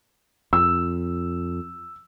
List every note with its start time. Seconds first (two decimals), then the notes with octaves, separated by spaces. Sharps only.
0.53 F2 E6